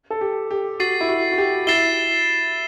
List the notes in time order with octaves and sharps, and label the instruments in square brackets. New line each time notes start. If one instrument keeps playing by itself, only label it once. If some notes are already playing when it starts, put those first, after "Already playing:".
[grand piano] A4
G4
G4
[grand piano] F#4 [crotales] A6 C7 D#7 F#7
[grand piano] E4
F#4
F#4
G4
[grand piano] E4 [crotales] A6 C7 E7 G7